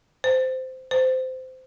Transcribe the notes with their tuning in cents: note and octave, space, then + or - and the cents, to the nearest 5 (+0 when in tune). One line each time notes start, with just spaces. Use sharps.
C5 -15
C5 -20